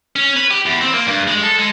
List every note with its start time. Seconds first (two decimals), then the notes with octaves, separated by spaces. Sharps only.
0.16 C#4
0.37 B4
0.50 G4
0.66 E2
0.81 C4
0.94 A#3
1.07 G2
1.27 G#3
1.43 A4
1.59 G#3